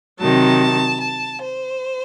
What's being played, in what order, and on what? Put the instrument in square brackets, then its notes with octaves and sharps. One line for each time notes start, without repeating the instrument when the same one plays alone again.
[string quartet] C3 D#3 F#3 A5
A5
C5